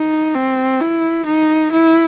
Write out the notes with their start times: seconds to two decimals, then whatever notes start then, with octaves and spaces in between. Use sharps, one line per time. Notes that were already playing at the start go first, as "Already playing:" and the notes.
Already playing: D#4
0.35 C4
0.81 E4
1.26 D#4
1.72 E4